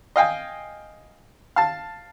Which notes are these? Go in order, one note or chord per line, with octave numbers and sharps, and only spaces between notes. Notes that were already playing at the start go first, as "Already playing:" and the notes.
D#5 F5 G5 G#5
F5 A5